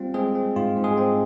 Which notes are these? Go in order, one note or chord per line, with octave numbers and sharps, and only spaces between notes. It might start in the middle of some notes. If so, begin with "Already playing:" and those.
Already playing: G3 C4 F4
G#3 C4 G#4
C4
G#2 F4
G#2
G#3 G#4
C4